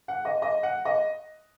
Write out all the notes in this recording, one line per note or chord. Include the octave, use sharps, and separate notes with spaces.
F#5
D#5
D#5
F#5
D#5